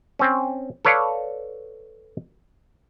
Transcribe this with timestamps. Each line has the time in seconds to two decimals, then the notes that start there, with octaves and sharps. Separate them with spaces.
0.19 C4 C#4
0.85 A4 B4 C#5 D5 F5